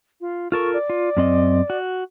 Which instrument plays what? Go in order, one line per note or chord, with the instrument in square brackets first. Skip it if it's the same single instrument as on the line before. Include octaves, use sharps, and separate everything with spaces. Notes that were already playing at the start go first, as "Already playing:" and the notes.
[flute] F4
[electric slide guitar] F4 A4 A#4 [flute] C#6
[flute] D5
[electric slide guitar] F4
F#2 C4 D#5
F#4